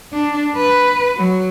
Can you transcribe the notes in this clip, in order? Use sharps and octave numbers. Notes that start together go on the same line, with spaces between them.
D4
B4
F#3